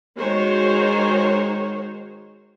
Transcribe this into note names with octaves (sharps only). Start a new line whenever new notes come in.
D#3 G#3 D#4 F#4 C5 C#5